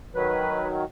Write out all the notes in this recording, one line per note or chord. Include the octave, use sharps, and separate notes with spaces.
D#3 F#3 B4